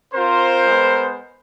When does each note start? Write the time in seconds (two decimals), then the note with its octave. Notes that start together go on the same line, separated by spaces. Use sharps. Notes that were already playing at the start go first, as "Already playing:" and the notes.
0.12 C4 F4 A#4 C5
0.67 G#3 B3